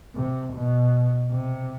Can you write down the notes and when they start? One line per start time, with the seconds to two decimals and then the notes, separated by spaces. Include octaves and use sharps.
0.15 C3
0.53 B2
1.31 C3